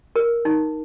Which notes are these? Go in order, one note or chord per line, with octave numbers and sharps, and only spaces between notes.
A#4
D#4